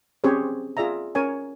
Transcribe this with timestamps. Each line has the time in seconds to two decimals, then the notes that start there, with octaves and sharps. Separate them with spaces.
0.24 C4 C#4 G4 G#4 C5 C#5
0.77 F4 G#4 D5 E5 A#5
1.15 C#4 A#4 C#5 G#5